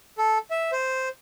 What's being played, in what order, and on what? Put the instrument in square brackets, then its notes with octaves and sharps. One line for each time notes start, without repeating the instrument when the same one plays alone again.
[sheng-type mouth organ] A4
E5
C5